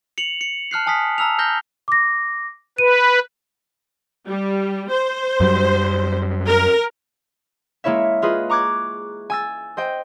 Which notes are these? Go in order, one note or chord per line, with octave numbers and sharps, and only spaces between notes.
C#7 F7 F#7
C#7
A5 F6 F#6 C7
G#5 A5 D#6 F6 B6
A5 A#5 E6 F6 F7
F6 G6 A#6 G7
D6 A#6
B4 D#7
G3
C5
F#2 F#3 G3
A#4
G#3 A#3 E4 C#5 E5
F4 G#4 B4 D#5
A#5 C#6 D6 F#6 G#6
G#5 E6 A6
C5 D#5 G5